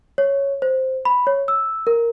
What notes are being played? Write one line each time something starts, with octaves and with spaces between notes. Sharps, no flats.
C#5
C5
B5
C#5
E6
A#4